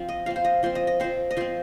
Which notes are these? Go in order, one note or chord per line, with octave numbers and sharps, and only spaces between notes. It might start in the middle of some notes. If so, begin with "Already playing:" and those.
Already playing: F3 C4
D#5
F3 C4 F5
C5
D#5
F3 C4 C5
D#5
D#5
F3 C4 C5
D#5
F3 C4 C5